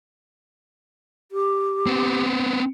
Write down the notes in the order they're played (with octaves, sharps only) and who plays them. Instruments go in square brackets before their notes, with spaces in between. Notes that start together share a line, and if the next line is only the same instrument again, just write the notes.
[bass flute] G4
[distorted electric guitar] B3 C4